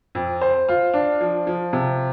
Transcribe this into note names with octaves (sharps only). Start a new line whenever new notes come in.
F2
C5
F4
D4
F3
F3
C3